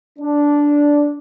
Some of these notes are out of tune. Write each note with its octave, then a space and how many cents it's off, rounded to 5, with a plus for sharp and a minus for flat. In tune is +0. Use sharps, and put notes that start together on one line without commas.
D4 -10